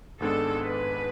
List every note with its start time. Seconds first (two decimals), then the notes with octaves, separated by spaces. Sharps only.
0.20 G#1 G#2 G#3 B3 D4 A4
0.63 B4